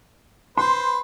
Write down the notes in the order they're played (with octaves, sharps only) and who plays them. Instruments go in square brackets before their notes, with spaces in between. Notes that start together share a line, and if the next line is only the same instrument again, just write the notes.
[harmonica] B4 C5 [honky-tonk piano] C6